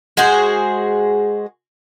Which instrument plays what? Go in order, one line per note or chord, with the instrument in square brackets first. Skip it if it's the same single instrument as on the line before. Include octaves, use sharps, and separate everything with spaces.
[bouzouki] G#3 F#4 G#4 C5